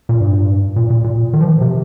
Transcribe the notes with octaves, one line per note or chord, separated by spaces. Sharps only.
A#2
G2
A#2
A#2
A#2
D#3
F3
D#3
C3